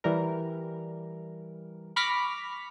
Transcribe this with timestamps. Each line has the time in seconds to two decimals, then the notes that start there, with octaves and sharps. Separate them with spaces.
0.04 E3 G3 A#4
1.96 B5 C#6 D6 F6 A#6 B6